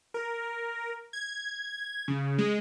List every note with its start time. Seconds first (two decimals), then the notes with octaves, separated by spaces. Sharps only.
0.14 A#4
1.13 G#6
2.08 C#3
2.38 G#3